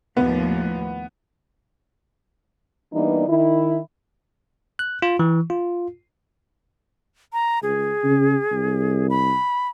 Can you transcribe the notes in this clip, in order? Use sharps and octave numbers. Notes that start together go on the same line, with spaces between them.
D#2 A2 F3 B3
E3 G3 A#3 B3 D4 D#4
D#3 E4
F#6
F4
E3
F4
A#5
C#2 G#4
C#3
C2
B5